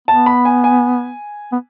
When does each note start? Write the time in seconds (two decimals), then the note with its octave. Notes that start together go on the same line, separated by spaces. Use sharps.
0.08 B3 A5
0.26 B5
0.45 G#5
0.64 G#5
1.52 B3